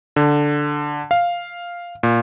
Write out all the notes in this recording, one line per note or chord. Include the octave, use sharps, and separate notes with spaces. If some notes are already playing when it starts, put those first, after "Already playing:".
D3
F5
A#2